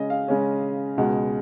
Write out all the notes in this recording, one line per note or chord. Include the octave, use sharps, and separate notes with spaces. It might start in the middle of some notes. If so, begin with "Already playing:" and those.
Already playing: C#3 G#3 C#4 D#5
F5
C#3 G#3 C#4
C#2 B2 G#3 F#5